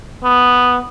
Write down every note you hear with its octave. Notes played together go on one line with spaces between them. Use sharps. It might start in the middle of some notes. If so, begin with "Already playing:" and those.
B3